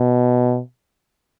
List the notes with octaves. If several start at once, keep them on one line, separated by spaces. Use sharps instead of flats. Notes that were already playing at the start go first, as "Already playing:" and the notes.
Already playing: B2